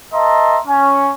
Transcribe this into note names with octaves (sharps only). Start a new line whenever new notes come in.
A#4 D#5 E5 A5 A#5 C6
C#4